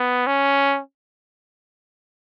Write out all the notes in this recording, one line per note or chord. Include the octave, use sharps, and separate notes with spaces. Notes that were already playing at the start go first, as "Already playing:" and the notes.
Already playing: B3
C#4